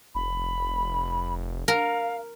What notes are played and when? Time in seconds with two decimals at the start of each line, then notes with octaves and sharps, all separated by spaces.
0.15 F1 B5
1.68 A#4 F5